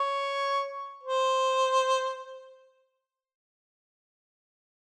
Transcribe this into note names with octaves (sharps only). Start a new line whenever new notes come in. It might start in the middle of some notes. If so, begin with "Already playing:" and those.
Already playing: C#5
C5